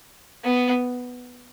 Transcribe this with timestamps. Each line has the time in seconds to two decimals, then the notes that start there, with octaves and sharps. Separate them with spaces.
0.44 B3